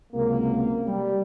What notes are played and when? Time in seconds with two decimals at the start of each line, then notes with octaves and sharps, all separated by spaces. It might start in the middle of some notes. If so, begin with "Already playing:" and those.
0.13 C#2 C3 F#3 A#3
0.86 G3